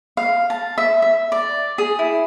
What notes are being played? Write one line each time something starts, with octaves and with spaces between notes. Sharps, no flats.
F5
A5
E5
E5
D5
G#4
E4